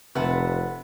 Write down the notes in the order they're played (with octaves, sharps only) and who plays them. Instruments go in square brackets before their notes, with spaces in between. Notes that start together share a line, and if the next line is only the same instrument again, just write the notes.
[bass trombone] F1 [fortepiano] C3 [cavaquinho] B4 F#5 A5